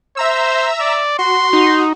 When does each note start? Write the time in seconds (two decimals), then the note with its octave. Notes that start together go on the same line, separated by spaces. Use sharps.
0.17 C5 E5 A#5 E6
0.81 D5
1.19 F#4 C6
1.53 D#4